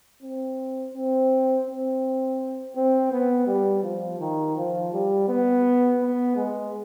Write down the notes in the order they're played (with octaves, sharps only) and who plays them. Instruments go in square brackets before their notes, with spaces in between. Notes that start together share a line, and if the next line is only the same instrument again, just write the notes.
[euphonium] C4
C4
C4
C4
B3
G3
F3
D#3
F3
G3
B3
B3
G#3